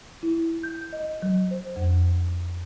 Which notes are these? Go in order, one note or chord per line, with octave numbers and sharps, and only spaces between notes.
E4
G6
D#5
F#3
C5
F2